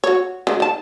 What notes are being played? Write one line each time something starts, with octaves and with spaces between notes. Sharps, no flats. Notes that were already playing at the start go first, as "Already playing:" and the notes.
F#4 C#5
C#3 F#3 G#3
D#3 A5